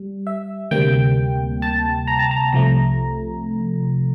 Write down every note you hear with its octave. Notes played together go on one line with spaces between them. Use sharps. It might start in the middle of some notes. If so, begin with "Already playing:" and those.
Already playing: G3
E5
D2 C3 G3 A#3 G5
A5
A#5
A5
A#5
C2 C3 F3 A3 A#5